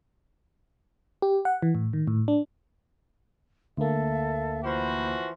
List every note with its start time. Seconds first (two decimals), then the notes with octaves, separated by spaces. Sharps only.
1.22 G4
1.45 F#5
1.62 E3
1.75 A2
1.93 D#3
2.07 A2
2.28 D4
3.77 D2 A#3 A4 E5 F5
4.64 E3 F3 F#4 C5 B5